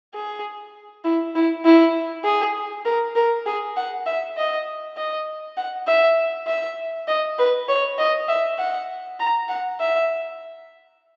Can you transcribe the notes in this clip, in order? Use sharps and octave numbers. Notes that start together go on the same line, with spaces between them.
G#4
E4
E4
E4
G#4
A#4
A#4
G#4
F#5
E5
D#5
D#5
F#5
E5
E5
D#5
B4
C#5
D#5
E5
F#5
A#5
F#5
E5